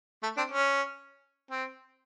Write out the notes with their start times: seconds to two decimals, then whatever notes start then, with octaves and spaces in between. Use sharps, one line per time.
0.23 A3
0.37 C4 D4
0.51 C#4
1.51 C4